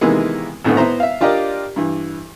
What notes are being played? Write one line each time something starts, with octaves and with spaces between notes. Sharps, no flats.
C3 D#3 E3 G#3 A#3 B3
G#1 A2 D3 B3
B3 E4 C5 A#5
E5 F5
D4 F4 G4 A#4 D5 D#5
G2 E3